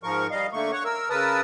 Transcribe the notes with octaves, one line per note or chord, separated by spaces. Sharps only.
G#2 F3 A#4 C#6
G3 D#5 F5
D3 A3 A#3 C#6
C#5 F#5 C#6
A#4 E6
C#3 A#4 B4 A5 D#6 E6